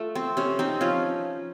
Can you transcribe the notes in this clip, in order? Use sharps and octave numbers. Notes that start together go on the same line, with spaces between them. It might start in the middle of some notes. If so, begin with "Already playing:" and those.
Already playing: A3 F4
C4
C3 C#4
C4 D#4
F3 C#4 F4